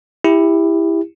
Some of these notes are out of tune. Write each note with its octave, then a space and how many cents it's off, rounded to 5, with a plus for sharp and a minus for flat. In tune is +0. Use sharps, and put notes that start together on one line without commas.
E4 +0 G4 +25